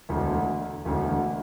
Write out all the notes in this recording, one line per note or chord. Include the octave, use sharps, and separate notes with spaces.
E1 D2 D3
E1 D2 D3